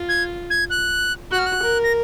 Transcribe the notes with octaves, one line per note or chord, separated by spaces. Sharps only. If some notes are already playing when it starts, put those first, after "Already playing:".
Already playing: F4
G#6
G#6
F#6
F#4 F#6
F6
F#6
A#4
A#6